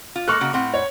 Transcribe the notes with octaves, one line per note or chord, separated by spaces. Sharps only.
F4
G#3 A#3 A4 C#6 F6 F#6
C#3 A#3 F#4
A2 C4 F#5
C#5